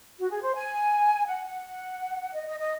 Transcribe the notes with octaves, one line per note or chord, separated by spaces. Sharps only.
F#4
G#4
C5
G#5
F#5
F#5
D#5
D#5
D#5